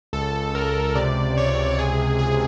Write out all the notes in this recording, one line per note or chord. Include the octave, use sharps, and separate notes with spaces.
C#2 A4
C#2 A#4
C3 D5
C3 C#5
C#2 G#4
C#2 G#4